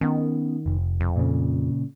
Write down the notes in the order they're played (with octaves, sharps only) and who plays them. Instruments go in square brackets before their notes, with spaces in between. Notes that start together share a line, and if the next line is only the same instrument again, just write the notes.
[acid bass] D#3 [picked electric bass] B3 C#4
[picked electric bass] F1
[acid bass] F2
[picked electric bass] A#2 C#3